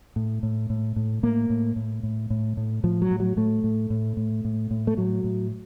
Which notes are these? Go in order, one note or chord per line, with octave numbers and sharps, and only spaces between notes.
A2
A2
A2
A2
A2 A#3
A2
A2
A2
A2
A2
A2 F3
F#3
A2
F#3
A2 A3
A2
A2
A2
A2
A2
A3
A2 F#3
A2